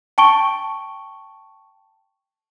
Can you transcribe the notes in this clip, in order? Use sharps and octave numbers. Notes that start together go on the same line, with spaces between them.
G5 A5 C#6 D7 G7